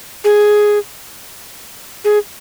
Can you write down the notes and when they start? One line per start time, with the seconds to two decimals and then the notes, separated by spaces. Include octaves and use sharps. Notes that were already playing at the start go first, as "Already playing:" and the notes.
0.24 G#4
2.05 G#4